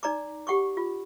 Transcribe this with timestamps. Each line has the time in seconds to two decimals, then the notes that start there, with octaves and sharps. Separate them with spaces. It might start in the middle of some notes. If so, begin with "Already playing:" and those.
0.03 D#4 D5 A#5 D6
0.47 G4 F#5 C#6 D6
0.77 F4